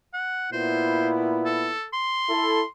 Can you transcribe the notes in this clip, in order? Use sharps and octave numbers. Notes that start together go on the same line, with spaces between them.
F#5
A#2 B3 E4 C5
A4
C6
E4 A4